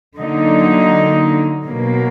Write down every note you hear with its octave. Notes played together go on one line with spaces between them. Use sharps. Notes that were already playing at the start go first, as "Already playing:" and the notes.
D3 F#3 A#3 D#4
B2 F#3 A#3